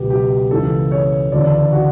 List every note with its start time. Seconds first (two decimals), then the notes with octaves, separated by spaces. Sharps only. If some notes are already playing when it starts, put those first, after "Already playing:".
Already playing: C#2 B2 F#3 B3 G4
0.10 G4
0.51 C#2 C#3 E3 A4
0.92 C#5
1.32 D2 C#3 E3 D5
1.72 F#4